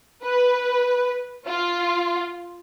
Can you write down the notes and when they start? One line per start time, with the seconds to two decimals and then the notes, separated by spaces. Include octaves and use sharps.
0.24 B4
1.47 F4